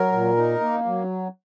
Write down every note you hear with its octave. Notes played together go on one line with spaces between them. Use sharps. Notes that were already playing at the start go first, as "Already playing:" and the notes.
Already playing: F#3 A#4
A#2
D#4
A#3
F#3